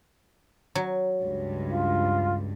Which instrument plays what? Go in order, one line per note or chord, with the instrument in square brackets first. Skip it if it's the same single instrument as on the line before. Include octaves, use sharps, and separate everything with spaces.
[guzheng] F#3
[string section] C#2 G2
[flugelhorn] F4